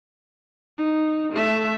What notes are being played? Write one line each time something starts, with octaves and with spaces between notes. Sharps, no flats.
D#4
A3 E5